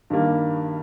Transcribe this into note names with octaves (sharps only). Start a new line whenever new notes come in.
G2 D#3 G3 A#3